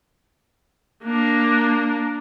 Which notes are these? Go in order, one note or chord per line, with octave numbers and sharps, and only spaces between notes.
A#3 D4